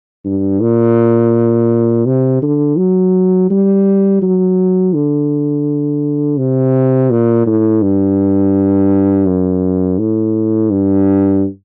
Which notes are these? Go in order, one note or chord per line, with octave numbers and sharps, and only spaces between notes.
G2
A#2
C3
D3
F#3
G3
F#3
D3
C3
A#2
A2
G2
F#2
A2
G2